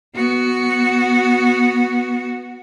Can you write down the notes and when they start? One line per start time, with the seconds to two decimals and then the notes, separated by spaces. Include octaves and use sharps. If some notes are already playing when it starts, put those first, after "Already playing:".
0.15 B3 F#4